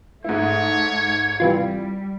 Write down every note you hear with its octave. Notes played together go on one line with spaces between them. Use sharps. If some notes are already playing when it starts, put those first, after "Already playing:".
G#2 A3 E4 C#5
C3 E3 G3 F4